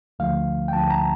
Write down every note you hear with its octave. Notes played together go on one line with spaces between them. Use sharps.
D2 D3 F3 A3 F5
G5
D2 D3 F3 A3 A5
A#5